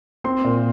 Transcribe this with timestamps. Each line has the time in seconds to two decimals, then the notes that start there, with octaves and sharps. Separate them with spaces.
0.24 C4 C6
0.44 A#2